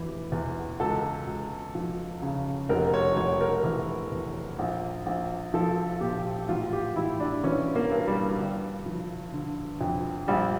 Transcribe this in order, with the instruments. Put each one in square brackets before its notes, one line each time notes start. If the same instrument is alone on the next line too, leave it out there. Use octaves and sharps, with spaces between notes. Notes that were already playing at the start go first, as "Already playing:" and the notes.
Already playing: [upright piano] F1 E3 G4
E2
C#2 A4
C#2
F3
C#3
F1 A#4
C#5
F1 C#5
A#4
E3
E2
A#1
A#1
F3 A4
A#2 G4
A1 F4
G4
A1 E4
D4
E3 C#4
A#3
G2
G3
G1
F3
D3
F2
A#1 G3